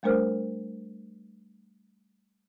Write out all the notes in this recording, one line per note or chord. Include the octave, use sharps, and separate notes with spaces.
G3 A3 D4 A#4 C5 F6